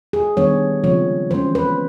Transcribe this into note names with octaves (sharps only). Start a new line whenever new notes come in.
G#4
D#3 G3 B3 D4 C#5
C#3 F3 G#3 C4 C#5
E3 G#3 C#4 C5
B4